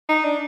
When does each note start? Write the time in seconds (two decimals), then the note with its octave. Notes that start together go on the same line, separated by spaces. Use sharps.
0.09 D#4
0.24 D4